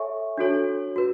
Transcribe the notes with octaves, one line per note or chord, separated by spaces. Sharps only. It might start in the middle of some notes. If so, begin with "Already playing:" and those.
Already playing: A4 C#5 E5 G#5 C#6
D4 F#4 A4 C#5
F#4 B4